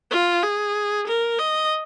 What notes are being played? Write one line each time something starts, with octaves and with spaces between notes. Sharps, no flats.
F4
G#4
A#4
D#5